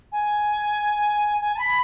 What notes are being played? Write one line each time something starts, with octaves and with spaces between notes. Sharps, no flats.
G#5
G#5
A5
B5